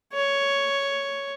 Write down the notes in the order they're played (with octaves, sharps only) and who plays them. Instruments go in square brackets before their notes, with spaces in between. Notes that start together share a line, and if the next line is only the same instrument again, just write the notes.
[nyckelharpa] C#5